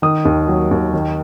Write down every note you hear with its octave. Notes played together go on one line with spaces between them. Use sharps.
D#3 D#6
D#2
F#3
D#2
D#3